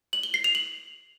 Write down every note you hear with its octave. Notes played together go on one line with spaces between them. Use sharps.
F#7
G7
C7
F7
F#7